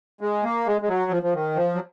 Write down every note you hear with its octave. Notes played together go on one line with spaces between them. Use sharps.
G#3
A#3
G#3
G#3
F#3
F3
F3
D#3
F3
F#3